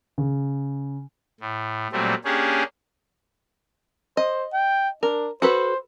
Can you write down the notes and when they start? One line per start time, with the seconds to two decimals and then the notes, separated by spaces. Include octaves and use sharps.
0.18 C#3
1.40 A2
1.92 A#2 F#3 G3 A3 C4
2.25 A#3 C#4 D4 G4 G#4
4.17 C5 D#5
4.53 G5
5.03 D4 A#4
5.42 F#4 A4 B4 C5